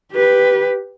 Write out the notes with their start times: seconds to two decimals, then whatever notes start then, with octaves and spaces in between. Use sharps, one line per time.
0.12 G4 B4